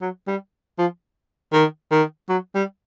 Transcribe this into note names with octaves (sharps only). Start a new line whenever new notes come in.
F#3
G3
F3
D#3
D#3
F#3
G3